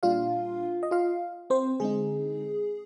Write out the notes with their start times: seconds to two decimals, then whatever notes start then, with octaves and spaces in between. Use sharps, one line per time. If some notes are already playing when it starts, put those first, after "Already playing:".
0.03 A#2 G3 D4 F4 F5
0.83 D#5
0.91 F4 F5
1.50 C4 C5
1.80 D3 G#3 C4 D#4 G#4